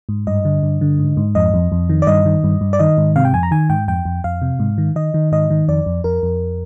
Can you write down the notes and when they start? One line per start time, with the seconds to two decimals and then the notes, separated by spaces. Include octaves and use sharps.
0.09 G#2
0.27 G2 D#5
0.45 D3
0.63 G2
0.81 D3
0.99 G#2
1.17 G#2
1.35 F2 D#5
1.54 F2
1.72 F2
1.89 D#3
2.02 D5
2.07 G2 D#5
2.26 D#3
2.44 G2
2.61 G2
2.73 D5
2.79 D#3 D#5
2.98 G#2
3.16 C3 F5
3.25 G5
3.33 F2 G#5
3.43 A#5
3.51 D#3 G#5
3.70 G#2 G5
3.88 F2 G5
4.05 F2
4.24 F2 F5
4.42 C3
4.59 G#2
4.78 D#3
4.96 D#3 D#5
5.14 D#3
5.32 G#2 D#5
5.50 D#3
5.68 F2 D5
5.86 F2
6.04 F2 A#4
6.23 F2